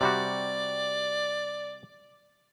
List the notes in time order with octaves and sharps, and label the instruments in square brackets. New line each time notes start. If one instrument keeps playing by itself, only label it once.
[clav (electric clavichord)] C3 G3 F#4 [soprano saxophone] D5